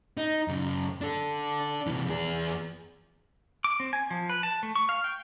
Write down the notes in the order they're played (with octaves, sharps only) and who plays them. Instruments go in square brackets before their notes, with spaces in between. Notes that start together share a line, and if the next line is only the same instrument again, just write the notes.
[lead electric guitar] D#4
F#2 C#3
D4 A4
C3 E3
E2 G#4
[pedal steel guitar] D6
C4
G#5
F3
B4
A5
A3
C#6
F5
G5